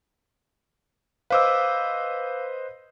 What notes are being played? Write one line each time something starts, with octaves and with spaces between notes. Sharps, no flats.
B4 C5 D#5 F5 D6 E6